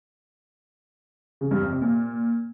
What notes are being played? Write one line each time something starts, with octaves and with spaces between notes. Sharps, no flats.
C#3
G2
F2
C3
A#2